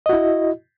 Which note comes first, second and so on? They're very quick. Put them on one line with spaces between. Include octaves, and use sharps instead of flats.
D#5 F#4 E4